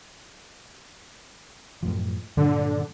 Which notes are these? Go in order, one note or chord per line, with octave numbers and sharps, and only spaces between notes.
F#2 A2 F3
G2 A#2 D3 F#3